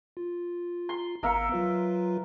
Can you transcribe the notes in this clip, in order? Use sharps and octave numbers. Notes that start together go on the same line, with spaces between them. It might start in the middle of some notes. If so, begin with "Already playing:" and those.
F4
C6
G#1 B3 A#4 E5 F5 C#7
F#3 F4 B4